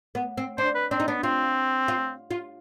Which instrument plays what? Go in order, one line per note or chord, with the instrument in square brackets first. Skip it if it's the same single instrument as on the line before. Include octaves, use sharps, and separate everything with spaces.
[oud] B3
C4
[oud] D4 [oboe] C5
[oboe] B4
[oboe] C4 [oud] D4
[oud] D#4
[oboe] B3 [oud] D4
[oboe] C4 [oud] F4
[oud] F4
F4